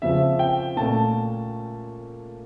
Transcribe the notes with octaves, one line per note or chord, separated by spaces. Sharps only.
F2 C#3 F3 E5
G5
A#2 A3 C#4 A5